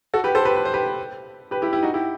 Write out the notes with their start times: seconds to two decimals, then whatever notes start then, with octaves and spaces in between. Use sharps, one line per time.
0.14 F#4 A4
0.24 G4 B4
0.35 A4 C5
0.45 G4 B4
0.56 B4
0.65 C5
0.74 G4 B4
1.51 G4 B4
1.62 E4 G4
1.72 E4 G4
1.83 D#4 F#4
1.94 E4 G4